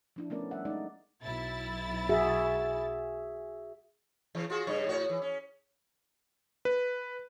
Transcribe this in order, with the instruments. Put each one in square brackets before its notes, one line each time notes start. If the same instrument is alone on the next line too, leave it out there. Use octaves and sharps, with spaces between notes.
[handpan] F3 D4 E4
A3 B3 C#4 A#4 D5
G3 E5 F#5
G#3 A3 D#4 D5
[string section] B1 E4 A6
[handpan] F#4 G#4 E5
[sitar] C#3 E3
F4 F#4 G#4
G2 C#3 C#5
A2 F#4 C#5
E3
C#4
[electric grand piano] B4